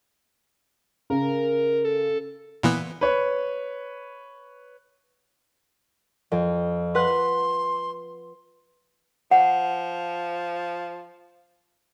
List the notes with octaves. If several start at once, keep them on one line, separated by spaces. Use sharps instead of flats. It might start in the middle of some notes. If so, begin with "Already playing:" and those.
C#3 A#4
A4
A#2 E3 B3
B4 C#5
F2
B4 F#5 C6 F#6
F3 F#5